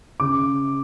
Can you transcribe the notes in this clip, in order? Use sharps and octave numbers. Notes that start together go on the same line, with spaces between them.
C#3 D6